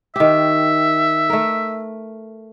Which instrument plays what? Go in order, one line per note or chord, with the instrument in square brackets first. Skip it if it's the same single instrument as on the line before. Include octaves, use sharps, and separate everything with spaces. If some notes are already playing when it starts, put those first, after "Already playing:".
[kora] D#3 G4 [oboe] E5
[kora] A3 A#4